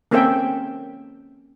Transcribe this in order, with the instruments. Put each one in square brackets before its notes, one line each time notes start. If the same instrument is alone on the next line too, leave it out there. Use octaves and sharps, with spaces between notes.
[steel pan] A#3 C4 C#4 A4 E5 G5